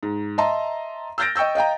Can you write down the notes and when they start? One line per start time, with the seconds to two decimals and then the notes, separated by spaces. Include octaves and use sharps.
0.03 G#2
0.38 D#5 E5 A5 A#5 C6
1.18 E6 F6 G6 A6 A#6 D7
1.35 D#5 G5 C#6 E6 G6
1.55 D#5 F5 G5 A#5